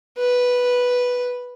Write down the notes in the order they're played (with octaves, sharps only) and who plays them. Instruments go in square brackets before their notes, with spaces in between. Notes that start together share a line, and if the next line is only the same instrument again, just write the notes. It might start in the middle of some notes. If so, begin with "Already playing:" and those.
[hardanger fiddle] B4